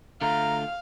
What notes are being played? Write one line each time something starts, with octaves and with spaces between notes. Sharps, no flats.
D3 A3 F4 F5 A#5